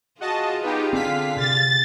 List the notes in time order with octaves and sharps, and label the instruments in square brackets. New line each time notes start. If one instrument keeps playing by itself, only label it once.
[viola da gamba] F4 G#4 [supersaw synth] F#4 D#5 A5
[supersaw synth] B3 D#4 G4
[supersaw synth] D3 F5 B6 [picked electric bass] C4
[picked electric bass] C3 [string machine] A6